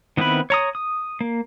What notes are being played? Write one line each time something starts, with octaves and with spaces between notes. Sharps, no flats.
D#3 B3 C4 E4 B4
C#5 A#5 D#6
D#6
A#3